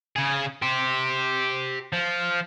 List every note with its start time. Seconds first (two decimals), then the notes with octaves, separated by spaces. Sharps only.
0.16 C#3 G#4
0.62 G4 C5
1.93 F3